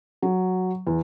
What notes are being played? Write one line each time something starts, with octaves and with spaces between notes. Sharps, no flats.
F#3
E2